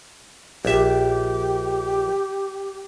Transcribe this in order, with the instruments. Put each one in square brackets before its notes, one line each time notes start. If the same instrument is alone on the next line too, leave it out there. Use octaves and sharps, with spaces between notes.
[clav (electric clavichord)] A#1 E5 [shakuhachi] G4